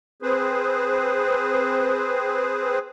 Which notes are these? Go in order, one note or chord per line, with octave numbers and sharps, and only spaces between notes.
C4 G#4 B4 C5